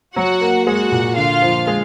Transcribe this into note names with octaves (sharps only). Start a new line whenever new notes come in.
F#3 F#4 F#5
A#3
G#3 F#4 F#5
A#2
D3 F4 F5
F3
G#3